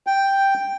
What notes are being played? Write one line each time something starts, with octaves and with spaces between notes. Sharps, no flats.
G5